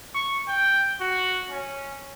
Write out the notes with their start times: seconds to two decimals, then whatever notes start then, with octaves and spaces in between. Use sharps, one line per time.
0.15 C#6
0.48 G5
1.00 F#4
1.50 C#4